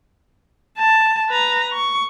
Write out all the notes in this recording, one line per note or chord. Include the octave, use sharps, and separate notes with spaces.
A5
B4 A#5
C#6